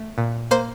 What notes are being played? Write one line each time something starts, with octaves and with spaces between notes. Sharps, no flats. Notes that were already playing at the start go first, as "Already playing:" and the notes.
Already playing: A3
A#2
A#3 C5